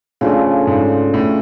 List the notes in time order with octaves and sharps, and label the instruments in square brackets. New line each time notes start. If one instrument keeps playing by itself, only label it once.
[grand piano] A2 [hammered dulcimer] C#3 F3 A3 D4
[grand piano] G#2
A2